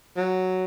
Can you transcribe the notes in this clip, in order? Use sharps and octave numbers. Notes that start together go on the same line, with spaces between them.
F#3